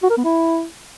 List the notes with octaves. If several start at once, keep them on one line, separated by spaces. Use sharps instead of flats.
F#4
A#4
B3
E4